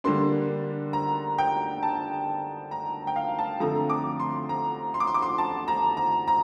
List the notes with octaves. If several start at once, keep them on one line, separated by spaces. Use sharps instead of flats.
D3 G3 A#3 D4 C6
A#5
G5
A5
A#5
G5
F5
A5
D3 F3 A3 C4 A#5
D6
C6
A#5
C6
D6
C6
D6
C6
A5
A#5
A#5
A#5